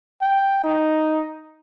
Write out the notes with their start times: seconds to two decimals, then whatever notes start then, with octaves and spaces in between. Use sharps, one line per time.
0.22 G5
0.64 D#4